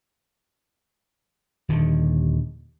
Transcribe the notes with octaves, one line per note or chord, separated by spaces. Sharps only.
D#1 D#2 D3 D#3